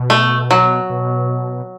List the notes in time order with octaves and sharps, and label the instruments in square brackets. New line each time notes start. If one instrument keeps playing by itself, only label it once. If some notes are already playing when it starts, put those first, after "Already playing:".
Already playing: [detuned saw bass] B2
[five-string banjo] A3
F#3
[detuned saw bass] B2